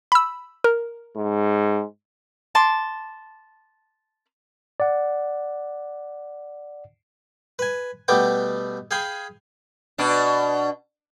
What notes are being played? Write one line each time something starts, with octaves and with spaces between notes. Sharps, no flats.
B5 E6
A#4
G#2
A5 C6 D6
D5 F#5
B4 G#5
B2 G3 A3 B3 G5 D6
G#4 F5 G5 G#5 B5 D#6
B2 D4